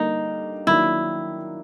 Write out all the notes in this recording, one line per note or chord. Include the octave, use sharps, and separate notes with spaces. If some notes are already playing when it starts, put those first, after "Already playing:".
Already playing: D3 G3 A#3 D#4
D#3 F#3 A#3 D4 E4